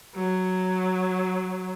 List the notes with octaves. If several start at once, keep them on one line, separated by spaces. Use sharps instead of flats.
F#3